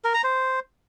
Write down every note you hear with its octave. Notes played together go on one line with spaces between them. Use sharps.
A#4
A#5
C5